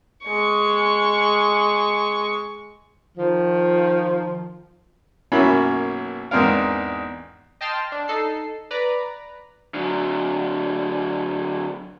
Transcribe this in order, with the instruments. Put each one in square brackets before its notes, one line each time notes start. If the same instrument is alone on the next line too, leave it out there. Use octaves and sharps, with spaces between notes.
[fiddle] G#3 C#6
[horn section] D#3 F3
[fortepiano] B1 F#2 A#3 C#4 E4 B5
E2 G#2 C4 D4 A#4 F5
[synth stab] D#5 G5 A5 C6 F6
D4
D#4 A4 C7
B4 D5 A#5
[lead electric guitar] D3 F#3